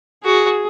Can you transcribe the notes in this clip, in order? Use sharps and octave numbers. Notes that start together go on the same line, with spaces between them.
F#4 G#4